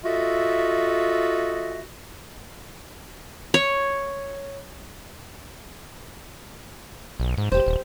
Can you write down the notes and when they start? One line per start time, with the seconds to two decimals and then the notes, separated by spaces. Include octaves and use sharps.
0.04 F4 F#4 A4 D#5 E5
3.54 C#5
7.20 B1
7.38 G#2
7.52 E1 G4 C5
7.66 D#1